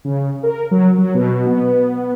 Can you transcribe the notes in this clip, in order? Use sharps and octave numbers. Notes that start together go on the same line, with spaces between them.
C#3
A#4
F#3
F#3
B2
B3